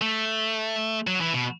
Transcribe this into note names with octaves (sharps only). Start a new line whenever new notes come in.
A3
F#3
E3
B2